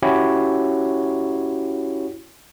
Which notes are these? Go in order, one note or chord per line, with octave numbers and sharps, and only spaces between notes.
C#4 E4 F#4 G4 C#5